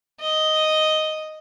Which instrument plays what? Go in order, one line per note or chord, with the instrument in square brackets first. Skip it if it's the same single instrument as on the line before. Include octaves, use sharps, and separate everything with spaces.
[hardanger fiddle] D#5